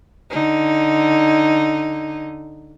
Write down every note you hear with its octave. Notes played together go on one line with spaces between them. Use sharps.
D3 D#4